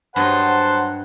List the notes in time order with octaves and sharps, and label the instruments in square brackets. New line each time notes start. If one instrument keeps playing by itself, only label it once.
[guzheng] G2 D#4 [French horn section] F#3 C5 [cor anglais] F#5 [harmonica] A5 C6